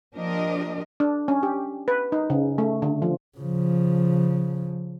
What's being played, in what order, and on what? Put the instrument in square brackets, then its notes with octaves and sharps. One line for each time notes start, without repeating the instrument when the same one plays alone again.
[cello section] F3 A#3 D4 G4 A#4 D#5
[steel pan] D4
C#4
G4
B4
D#4
C#3
A3
D3
F3
[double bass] C#3 F3